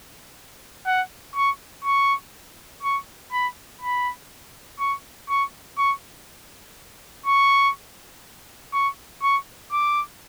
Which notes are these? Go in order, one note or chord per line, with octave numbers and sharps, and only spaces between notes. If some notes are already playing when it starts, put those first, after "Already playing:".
F#5
C#6
C#6
C#6
B5
B5
C#6
C#6
C#6
C#6
C#6
C#6
D6